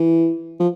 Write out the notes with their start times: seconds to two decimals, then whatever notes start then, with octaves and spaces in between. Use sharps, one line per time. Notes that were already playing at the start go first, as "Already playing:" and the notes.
Already playing: E3
0.60 F3